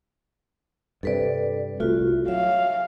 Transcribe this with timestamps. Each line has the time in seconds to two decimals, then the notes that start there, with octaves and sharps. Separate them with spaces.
1.03 G2 C3 A4 B4 D5
1.80 C2 A3 F4 F#4
2.28 F#3 E5 F5